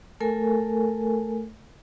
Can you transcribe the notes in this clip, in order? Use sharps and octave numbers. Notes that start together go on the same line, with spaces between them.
A3 A4 A#4 G#5